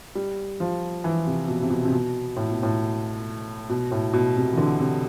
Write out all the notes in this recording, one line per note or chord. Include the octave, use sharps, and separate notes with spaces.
G3
F3
E3
C3
B2
C3
B2
C3
B2
A2
B2
A2
B2
A2
B2
C3
E3
D3
C3